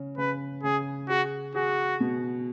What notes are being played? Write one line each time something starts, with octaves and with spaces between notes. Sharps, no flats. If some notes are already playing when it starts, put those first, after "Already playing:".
Already playing: C#3 C#4
C#3 B4
C#3 G#4
F#4 G#4
F#4 G#4
B2